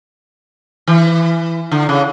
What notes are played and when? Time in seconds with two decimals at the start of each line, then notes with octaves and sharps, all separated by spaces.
0.87 E3
1.71 D3
1.89 C#3